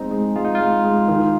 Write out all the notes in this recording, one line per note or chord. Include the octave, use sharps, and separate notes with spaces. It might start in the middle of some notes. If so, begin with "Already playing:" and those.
Already playing: G#3 C4 D#4
G#3
G#3 F4
D#4
F4
G#3
G#3
D#3